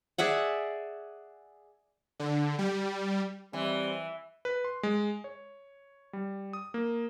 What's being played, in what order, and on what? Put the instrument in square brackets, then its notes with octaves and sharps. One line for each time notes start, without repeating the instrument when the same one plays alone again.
[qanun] G#4 D5 E5 F#5
[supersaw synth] D3
G3
[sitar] E3 [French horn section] G3 C4
[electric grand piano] B4
C6
G#3
C#5
G3
D#6
A#3